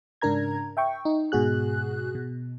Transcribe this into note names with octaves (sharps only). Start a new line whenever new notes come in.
G#2 C#3 D4 A#4 A#5 G#6
E5 G5 C#6
D#4
G#2 B2 F#4 G#4 F#6
B2